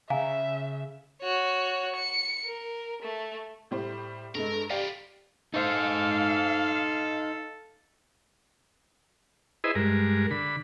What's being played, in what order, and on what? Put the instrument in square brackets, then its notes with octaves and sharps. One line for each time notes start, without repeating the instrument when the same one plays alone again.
[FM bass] C#3 [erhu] E5 [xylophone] F5 G#5 A#5
[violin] F#4 C#5
C#7
A#4
A3
[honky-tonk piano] A2 G3 C5
[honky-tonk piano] G2 G#3 [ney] A4 [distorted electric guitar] A#4
[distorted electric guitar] G3 F4 [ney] G4 [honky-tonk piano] D5 F5 G5
[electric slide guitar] D#4 C5 [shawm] A4 [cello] F5
[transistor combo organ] E4 G#4 B4 C5 D#5
G2 G#3 A#4
D3 B5